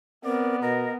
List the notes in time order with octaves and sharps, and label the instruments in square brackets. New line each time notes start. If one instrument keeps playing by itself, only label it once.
[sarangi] B3 [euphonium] C4 [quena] A#4 [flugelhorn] D5
[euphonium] B2 [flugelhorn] A#4 [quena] D#5